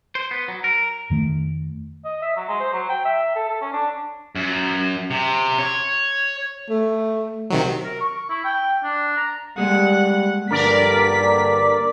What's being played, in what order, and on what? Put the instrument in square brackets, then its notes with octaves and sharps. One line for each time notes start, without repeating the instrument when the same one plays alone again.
[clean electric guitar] C5
B3
F#3
A#4
[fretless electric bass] F2 D#3 A3
[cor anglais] D#5
E5
F#3
G#3
C5
F#3
G5
E5
A4
A4
C#4
D4
[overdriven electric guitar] F#2
C3
C#5
[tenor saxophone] A3
[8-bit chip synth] C3 D#3 F#3
[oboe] A#4
C#6
E4
G5
D4
A#5
[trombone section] G3 [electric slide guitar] G#3 A#3 G#4 [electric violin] F#5
[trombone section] G2 D3 [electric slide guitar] A#3 D4 [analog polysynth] A#4 D5 [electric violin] B6